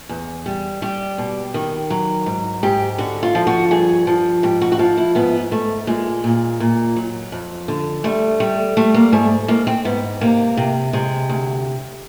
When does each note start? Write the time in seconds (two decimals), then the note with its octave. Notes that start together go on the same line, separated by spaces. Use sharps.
0.09 E2
0.46 G3
0.82 G3 G4
1.18 B2
1.54 D#3
1.90 F#3
2.26 G#2
2.63 G#2 G4
2.98 D3 F#4
3.23 F4
3.35 F3
3.47 F#4
3.71 G2 G#4
4.07 F3
4.43 G#2 G4
4.61 F#4
4.72 F#4
4.79 F3 F4
4.97 E4
5.15 G#2 B3
5.51 G#2 A3
5.87 A#2 G#3
6.24 A#2
6.60 A#2
6.96 F#3
7.32 F2
7.68 D3
8.04 G3 A3
8.40 G3
8.77 G3 A3
8.94 A#3
9.12 G#2 A3
9.48 G#2 A#3
9.67 C4
9.85 G#2 B3
10.21 C3 A#3
10.57 C3
10.93 C3 G#3
11.29 D2